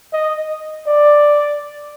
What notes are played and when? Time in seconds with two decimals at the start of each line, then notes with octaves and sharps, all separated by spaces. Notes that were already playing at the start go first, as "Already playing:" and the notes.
0.13 D#5
0.87 D5